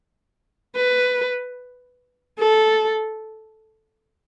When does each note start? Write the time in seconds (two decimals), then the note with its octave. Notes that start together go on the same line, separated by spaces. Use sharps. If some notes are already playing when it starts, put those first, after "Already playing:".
0.76 B4
2.39 A4